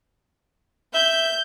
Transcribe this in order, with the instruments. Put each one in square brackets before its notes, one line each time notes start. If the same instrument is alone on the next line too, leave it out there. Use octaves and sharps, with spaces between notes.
[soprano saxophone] E5 [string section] G6